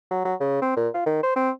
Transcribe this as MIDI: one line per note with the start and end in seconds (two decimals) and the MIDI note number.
0.11 0.20 54
0.25 0.35 54
0.41 0.61 49
0.62 0.73 60
0.77 0.88 46
0.94 1.03 65
1.06 1.18 51
1.23 1.33 72
1.36 1.50 60